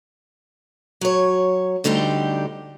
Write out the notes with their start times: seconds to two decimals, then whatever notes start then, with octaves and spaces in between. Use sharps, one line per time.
1.01 F#3 C#5
1.84 D2 D3 G3 D#4 G4